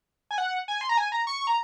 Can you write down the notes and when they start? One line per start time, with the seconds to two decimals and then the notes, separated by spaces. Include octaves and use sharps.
0.31 G#5
0.38 F#5
0.68 G#5
0.81 C6
0.89 A#5
0.97 G#5
1.12 A#5
1.27 C#6
1.47 A#5